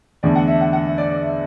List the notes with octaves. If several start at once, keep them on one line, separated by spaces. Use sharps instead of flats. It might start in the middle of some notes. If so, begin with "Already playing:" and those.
E2 D3 A3 D5
F#5
E5
F#5
F#5
E5
D5
D5
E5